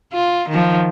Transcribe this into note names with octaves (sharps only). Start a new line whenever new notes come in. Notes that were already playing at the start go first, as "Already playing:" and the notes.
F4
D#3 F3